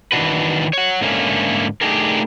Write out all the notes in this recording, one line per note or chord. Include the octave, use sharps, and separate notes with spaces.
D#3 E3 D4 F#4 B4
C#5 F#5
G#2 D3 A3 A#3 C#4
A3 D4 D#4 G4 G#4 A#4